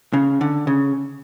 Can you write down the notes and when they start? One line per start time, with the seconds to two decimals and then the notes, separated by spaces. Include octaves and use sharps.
0.13 C#3
0.41 D3
0.67 C#3